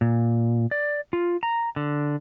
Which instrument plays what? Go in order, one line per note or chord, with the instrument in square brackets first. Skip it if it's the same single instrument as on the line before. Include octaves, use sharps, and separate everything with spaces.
[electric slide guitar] A#2
D5
F4
A#5
D3